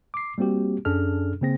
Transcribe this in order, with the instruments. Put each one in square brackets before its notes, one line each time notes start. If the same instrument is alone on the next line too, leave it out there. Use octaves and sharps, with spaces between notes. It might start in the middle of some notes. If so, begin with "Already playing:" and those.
[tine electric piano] D6 C7
G3 A#3 C4 F#4 G4
F#2 C#4 D4 G#4 A4 F6
C#3 A#3 C4 G#4 A#6